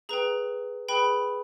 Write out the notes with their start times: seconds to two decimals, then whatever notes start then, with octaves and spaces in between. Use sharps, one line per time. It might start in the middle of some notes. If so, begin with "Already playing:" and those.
0.09 G#4 B4 G5 A#5
0.88 G#4 B4 G5 B5